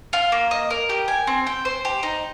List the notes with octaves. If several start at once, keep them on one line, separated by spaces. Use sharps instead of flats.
F4
A#3
D#5
A#4
G4
G#5
C4
G5
C5
G4
D#4